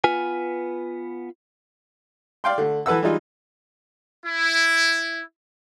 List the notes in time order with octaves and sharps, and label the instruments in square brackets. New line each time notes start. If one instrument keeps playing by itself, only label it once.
[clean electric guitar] B3 F4 B4 G#5
[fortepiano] D5 F5 G5 C6
D3 A3
E3 A4 B4 F#5 E6
E3 G3 G#3 D#4 F4
[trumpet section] E4